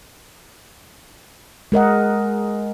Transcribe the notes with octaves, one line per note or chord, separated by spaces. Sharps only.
G#3 A#4 D#5 F#5